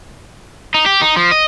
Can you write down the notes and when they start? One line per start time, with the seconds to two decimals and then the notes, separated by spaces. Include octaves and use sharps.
0.74 D#4
0.86 G4
1.01 D#4
1.16 F3
1.31 D#5